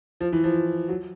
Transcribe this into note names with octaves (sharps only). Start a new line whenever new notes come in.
F3
E3
F3
F#3